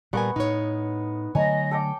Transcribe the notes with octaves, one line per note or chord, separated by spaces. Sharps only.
A#2 G3 B3 A#4 F#5 G#5 C#6
A2 D#4 C#5
D3 F#3 A3 C#5 D#5 G#5 A#5
A4 G5 D6